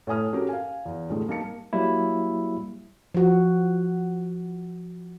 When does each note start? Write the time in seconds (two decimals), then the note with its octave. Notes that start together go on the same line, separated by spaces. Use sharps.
0.07 A2 C#5 G#5 D#6 F6
0.33 C#4 F#4 G4 A4 A#4
0.49 F5 G#5
0.85 E2
1.10 A2 D3 G3 G#3
1.28 G3 A#3 D#4 A5 C#7
1.73 F#3 G3 A#3 E4
3.15 F3 F#4